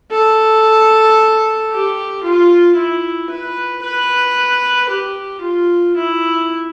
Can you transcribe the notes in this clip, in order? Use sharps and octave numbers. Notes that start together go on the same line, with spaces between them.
A4
G4
F4
E4
B4
B4
G4
F4
E4